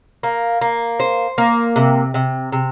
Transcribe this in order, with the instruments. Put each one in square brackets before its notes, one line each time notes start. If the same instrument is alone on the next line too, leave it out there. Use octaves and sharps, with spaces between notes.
[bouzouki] A#3
A#3
C5
A#3
C3
C3
C3